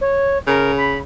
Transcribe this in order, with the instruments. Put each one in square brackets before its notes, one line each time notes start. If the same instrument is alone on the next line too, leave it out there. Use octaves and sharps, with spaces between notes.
[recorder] C#5
[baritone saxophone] C#3 [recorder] A#4
[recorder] B5